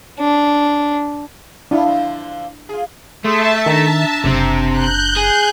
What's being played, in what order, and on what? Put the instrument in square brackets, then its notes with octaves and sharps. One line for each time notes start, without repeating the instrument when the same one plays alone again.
[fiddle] D4
[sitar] A2 B3 F4 [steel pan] D4 E4
[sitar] D3 F3 C4
F4 G#4
[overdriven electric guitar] A3 [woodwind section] G#4 C6 [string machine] E5 A5
[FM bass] D#3 [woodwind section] D4 A#5
[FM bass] F#1 [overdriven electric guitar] C3 C4
[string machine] F#6 G6
[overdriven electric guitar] G#4